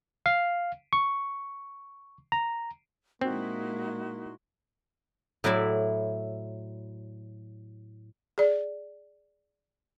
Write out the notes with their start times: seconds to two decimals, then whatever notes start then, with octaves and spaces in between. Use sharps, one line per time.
0.26 F5
0.93 C#6
2.32 A#5
3.21 A#2 G#3 A#3 C4 D#4 E4 F#4 C6
5.44 A2 F#3 E4 D5 E5
8.38 G#4 D5